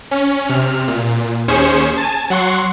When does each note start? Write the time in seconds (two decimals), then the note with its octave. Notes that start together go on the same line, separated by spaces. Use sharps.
0.11 C#4
0.48 C3 F6
0.88 A#2
1.48 D#2 C#4 G#4 C5 C#6 E7
1.97 G#5 A5
2.30 F#3 F#5 C6 C#6